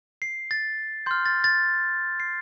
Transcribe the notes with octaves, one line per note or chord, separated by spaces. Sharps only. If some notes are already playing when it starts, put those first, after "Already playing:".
C7
A6
C6 F6 G6
A6
A6
C7